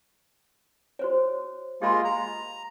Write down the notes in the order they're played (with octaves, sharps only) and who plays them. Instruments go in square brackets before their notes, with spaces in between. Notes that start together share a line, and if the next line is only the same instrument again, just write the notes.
[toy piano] F#4 C5 C#5
[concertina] G#3 A#3 F4 [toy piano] G4 B5 C6
[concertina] A#5